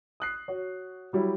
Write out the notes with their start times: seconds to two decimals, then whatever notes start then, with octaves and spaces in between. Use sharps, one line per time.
0.20 D#6 F#6 C7
0.48 F#4 C#5
1.13 F#3 G3 E4